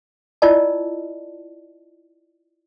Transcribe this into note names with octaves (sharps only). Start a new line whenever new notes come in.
E4 F4 A#4 D5 D#5 A5